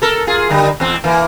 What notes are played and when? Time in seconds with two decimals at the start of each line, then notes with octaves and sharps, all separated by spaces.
0.02 A4 A#4
0.27 F4 G#4
0.50 D3 G3 D#4
0.80 E2 C4
1.04 E3 A#3